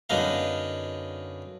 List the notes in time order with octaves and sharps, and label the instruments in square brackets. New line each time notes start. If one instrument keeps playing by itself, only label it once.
[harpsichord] F#2 D3 B3 D#4 F5